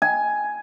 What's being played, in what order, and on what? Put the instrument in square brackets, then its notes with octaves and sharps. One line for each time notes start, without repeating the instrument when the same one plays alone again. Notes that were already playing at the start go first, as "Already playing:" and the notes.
[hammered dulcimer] G#5